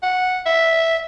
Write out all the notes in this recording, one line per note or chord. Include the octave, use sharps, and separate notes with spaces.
F#5
E5